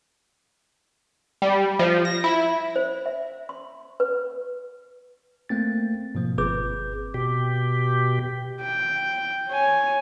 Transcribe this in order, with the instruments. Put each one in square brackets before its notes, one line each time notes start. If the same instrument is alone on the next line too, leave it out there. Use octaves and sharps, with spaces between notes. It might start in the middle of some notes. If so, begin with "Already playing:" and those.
[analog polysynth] G3
F3
A#6
E4
[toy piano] C5
E5
C6
B4
[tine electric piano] A3 A#3 C4 A6
G#2 B2 F3 A#3
G1 C4 G#4 B4 D6 G6
[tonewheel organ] B2 G4
[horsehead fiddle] G5
C#5 G#5